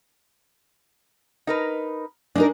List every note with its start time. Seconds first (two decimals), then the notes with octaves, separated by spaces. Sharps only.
1.47 D#4 A#4 B4
2.35 G#3 D4 D#4 A#4